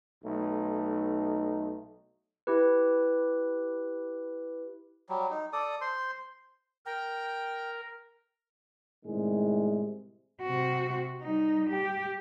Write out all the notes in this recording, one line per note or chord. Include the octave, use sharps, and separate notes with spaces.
B1 A3 D#4
E4 G4 B4
F#3 G3
D#4
A4 D5 D#6
C5 C6
A#4 G5
A2 C3 D#3 G3 G#3
C3 F#4
G3 D#4
G4